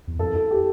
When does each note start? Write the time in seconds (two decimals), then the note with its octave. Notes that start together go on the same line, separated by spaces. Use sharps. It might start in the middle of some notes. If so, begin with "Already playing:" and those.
0.07 E2
0.19 F2 A4
0.35 A4
0.51 G4